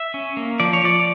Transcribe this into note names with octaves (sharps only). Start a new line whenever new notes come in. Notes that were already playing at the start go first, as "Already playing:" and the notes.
Already playing: E5
C#4
A#3
F3 D5
C#5
F3 D5